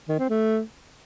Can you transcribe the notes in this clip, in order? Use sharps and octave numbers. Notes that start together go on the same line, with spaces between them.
D#3
C4
A3